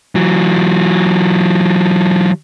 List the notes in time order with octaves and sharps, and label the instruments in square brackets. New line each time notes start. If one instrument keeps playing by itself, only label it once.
[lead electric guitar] E3 F#3